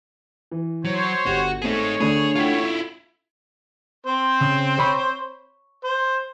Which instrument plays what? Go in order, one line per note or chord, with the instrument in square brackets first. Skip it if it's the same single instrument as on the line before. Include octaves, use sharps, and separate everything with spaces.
[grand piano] E3
[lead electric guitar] F#3 [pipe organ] C5 C#5
[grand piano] G1 G4 [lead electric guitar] F#4
[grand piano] A3 C4 A4 [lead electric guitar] D#4 G#4 [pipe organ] C#5
[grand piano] D3 B5 [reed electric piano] A3 D4 [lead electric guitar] G#4
[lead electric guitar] E4 F4 [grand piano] A4 F#5 G5
[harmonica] C4 C5
[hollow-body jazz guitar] C#3
C#5 B5
[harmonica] C5